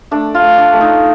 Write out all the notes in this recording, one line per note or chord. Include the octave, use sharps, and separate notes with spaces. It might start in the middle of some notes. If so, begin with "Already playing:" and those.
A3 D4
F4
A3
D4
A3
D#4